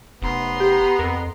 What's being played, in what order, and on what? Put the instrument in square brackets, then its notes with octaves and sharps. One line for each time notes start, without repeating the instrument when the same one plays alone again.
[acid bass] F1 [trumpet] B3 [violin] A#5 C6
[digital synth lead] G4
[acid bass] F2 [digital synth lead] A#4